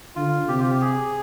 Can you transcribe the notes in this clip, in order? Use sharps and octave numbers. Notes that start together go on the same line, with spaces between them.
D3 F4
C3 G4
F4
G4
G#4